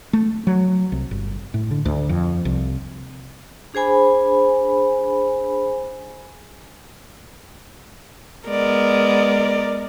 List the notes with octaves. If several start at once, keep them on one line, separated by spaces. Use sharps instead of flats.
A3
F#3
C2
G1
A2
D3
D2
F2
C2
D4 G#4 C5 G#5 B5
G#3 B3 A#4 D5